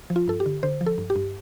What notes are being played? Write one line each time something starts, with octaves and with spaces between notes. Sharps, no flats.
F3
F4
G2 A4
G4
D3
D3 C5
F3
A4
G2
G4
G2